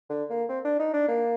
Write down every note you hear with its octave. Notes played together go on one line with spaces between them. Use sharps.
D3
A#3
C4
D4
D#4
D4
A#3